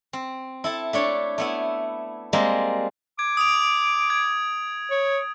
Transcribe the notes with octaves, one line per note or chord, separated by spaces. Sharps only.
C4
E4 A4 A5
A3 D4 C#5
A3 B3 E4
G3 G#3 A#3 C4
D6 G#6
D#6 D7 F7
G#6
C#5